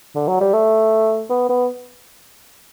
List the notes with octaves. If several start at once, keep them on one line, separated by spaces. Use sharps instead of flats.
D3
F#3
G3
A3
B3
B3